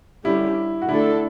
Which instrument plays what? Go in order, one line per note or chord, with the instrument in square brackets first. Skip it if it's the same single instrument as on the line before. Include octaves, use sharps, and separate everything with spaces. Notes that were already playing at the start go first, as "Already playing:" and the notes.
[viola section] D3 G3 C#4 G4 [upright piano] E4
[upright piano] F#4
[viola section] D3 A3 D4 A4 [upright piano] E4